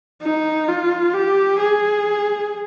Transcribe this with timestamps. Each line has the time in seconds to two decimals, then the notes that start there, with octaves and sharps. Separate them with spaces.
0.22 D#4
0.68 F4
1.14 G4
1.59 G#4